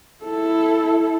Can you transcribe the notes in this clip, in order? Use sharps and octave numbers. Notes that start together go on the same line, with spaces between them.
E4 A4